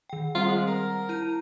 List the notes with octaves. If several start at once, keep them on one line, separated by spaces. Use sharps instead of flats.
D#3 G5
G3 C4 F4 F#5
G#3
A#4
E4 D#7